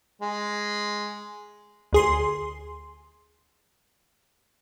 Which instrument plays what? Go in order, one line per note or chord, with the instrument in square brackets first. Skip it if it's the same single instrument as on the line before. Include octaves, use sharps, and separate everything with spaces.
[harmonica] G#3
[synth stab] D2 G#4 C6